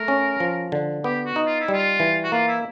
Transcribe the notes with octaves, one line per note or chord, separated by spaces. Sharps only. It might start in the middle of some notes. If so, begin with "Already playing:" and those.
Already playing: A3 A#4
C#4
F3
D3
B3 G4
F#4
D#4
F4
E4
G3 F4
E3
F#4
A#3 F4
E4